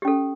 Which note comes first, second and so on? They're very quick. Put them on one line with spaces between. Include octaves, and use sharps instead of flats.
G4 C#4 A4